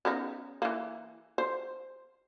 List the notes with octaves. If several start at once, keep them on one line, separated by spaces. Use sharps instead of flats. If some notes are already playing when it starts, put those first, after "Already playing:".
C#3 B3 D#4
E3 A#3
C5